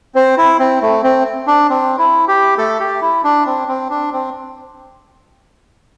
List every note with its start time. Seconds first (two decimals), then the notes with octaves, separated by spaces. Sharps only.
0.15 C4 C5
0.37 E4
0.59 C4
0.82 A3
1.04 C4
1.47 D4
1.70 C4
1.99 E4
2.28 G4
2.58 A3 A4
2.80 G4
3.01 E4
3.24 D4
3.46 C4
3.68 C4
3.90 D4
4.13 C4